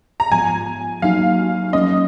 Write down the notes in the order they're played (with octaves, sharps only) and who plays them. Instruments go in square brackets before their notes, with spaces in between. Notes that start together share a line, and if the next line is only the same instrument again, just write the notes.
[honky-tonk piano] A#5
[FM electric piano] G#2 F3 B3 F4 [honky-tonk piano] G#5
[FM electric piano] F#3 A#3 D#4 F#4 [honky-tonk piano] F5
[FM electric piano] F#3 A#3 C#4 [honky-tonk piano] D#5